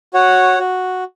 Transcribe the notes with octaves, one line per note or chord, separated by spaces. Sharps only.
F#4 C#5 F#5
F#4